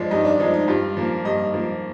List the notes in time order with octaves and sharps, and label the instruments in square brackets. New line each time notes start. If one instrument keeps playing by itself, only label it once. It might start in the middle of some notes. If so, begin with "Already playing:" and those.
Already playing: [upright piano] G2 F3 G#3 D5
G2 D#4
D4
F3 G#3 D#4
D#4
G2 F4
F3 A#3
G2 D#5
F3 A#3